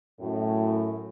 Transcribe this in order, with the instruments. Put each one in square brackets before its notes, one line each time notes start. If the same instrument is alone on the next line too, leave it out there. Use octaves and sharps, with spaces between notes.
[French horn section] F#2 A2